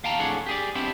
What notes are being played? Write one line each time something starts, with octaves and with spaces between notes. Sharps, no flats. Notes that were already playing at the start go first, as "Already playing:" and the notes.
D#2 F5 G5 A5 A#5
F2 A2 D4 G#4 C#5 F#5
G4 G#4 D5
B3 C4 D4 E4 G4